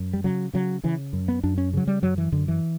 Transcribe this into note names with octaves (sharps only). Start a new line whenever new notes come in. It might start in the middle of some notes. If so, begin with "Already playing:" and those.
Already playing: F#2
G3
C#3 F#3
C#3 F#3
C#3 E3
F#2
B3
F#2 D4
C#4
C#3 F#3
G3
F#2 F#3
E3
F#2 D3
E3